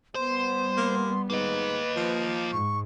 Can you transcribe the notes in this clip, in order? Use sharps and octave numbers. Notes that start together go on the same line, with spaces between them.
G3 B3 C5 C6
A#3
G#2 A#3 B4 D#5
F3
G#2 C#6